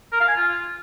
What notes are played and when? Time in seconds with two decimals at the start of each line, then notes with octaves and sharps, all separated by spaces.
0.13 A#4
0.20 F5
0.28 G#5
0.36 F4